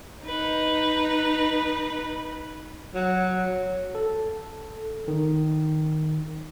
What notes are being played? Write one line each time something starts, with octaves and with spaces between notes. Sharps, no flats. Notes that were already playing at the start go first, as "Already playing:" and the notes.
D#4 B4
F#3
A4
D#3